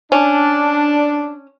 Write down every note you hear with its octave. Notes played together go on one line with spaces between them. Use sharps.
C#4 D4